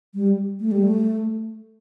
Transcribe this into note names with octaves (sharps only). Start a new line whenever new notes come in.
G3
A3
G3
A3